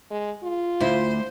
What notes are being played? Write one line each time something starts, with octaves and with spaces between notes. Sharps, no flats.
G#3
F4
D2 E4 C5